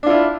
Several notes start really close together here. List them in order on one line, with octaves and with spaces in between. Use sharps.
D4 F4 E4